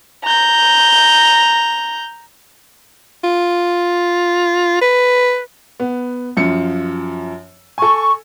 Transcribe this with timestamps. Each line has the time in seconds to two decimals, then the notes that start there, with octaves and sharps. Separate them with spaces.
0.24 A#5 G6
3.24 F4
4.81 B4
5.80 B3
6.37 F#2 F3 C#7
7.78 A4 G#5 C#6